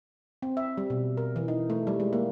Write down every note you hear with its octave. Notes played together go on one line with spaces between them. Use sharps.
C4
E5
G3
B2
A#4
E3
D#4
A3
G3
G#3
A#3